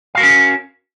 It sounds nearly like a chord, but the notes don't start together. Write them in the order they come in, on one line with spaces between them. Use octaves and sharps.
F5 F#4 A#4 C#4